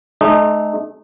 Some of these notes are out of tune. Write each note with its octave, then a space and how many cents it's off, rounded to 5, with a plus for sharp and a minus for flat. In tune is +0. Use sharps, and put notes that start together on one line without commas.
A3 -40 D#4 -30